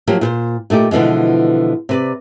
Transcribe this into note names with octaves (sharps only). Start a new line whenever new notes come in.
F3 F#3 A#3 G4
A#2 B4 C5
A#2 A3 D#4 G4
B2 D3 E3 F3 G#3
C3 B4 D5